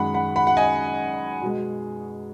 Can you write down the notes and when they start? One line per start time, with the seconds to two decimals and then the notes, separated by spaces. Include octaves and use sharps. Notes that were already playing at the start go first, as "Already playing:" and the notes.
Already playing: F#2 D#3 G#3 F#5 B5
0.14 F#5 B5
0.36 F#5 B5
0.47 F#5
0.57 D#5 G#5
1.42 B2 G#3